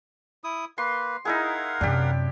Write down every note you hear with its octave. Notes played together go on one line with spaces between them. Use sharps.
E4 D#6
A#3 B4 C6
D#4 E4 G#4 A#4 F5 F#5
F#2 C3 D4 G4